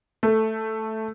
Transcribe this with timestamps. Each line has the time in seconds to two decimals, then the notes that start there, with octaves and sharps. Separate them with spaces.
0.23 A3